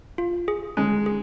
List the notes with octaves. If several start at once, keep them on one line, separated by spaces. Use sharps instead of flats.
F4
G#4
G#3 C#4
G#4